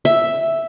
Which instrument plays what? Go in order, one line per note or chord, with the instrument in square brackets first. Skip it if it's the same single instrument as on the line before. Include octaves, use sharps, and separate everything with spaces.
[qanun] E5